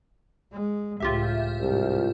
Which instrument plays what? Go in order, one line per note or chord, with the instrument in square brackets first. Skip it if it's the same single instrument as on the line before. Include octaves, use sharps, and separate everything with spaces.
[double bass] G#3
[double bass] C#2 A2 [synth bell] F4 G4 E5
[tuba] C2 [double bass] G#2